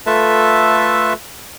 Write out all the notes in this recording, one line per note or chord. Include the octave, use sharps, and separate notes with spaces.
A3 F4 A4 B4 E5 A5